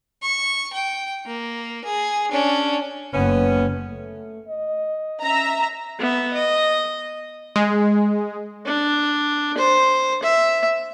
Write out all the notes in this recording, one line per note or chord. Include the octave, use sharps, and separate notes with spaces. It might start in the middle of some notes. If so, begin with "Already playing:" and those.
C#6
G5
A#3
G#4
C#4 D4
F#1 B3 C#4
A3
D#5
C#4 E5 A#5
B3 E5
D#5
G#3
D4
C5
E5